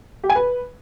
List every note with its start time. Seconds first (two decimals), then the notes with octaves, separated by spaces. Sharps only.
0.24 G4
0.30 G#5
0.36 B4